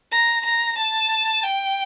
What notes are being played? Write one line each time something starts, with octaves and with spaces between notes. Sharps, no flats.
A#5
A#5
A5
G5